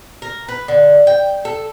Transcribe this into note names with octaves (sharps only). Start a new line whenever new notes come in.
A#4
B4
D3
G5
A4